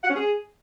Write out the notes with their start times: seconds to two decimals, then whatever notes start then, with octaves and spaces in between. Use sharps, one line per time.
0.04 F#5
0.09 C#4
0.15 G#4